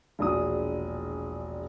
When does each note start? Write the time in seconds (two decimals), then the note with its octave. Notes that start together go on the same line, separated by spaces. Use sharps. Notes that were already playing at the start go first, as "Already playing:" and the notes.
0.19 E1 A#1 G#4 D#6